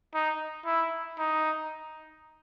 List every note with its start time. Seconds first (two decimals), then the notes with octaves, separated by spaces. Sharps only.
0.14 D#4
0.66 E4
1.19 D#4